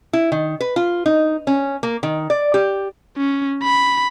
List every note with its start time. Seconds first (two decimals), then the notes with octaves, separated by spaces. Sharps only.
0.13 E4
0.32 D#3
0.61 B4
0.76 F4
1.06 D#4
1.47 C#4
1.83 A#3
2.03 D#3
2.30 D5
2.54 G4
3.17 C#4
3.63 B5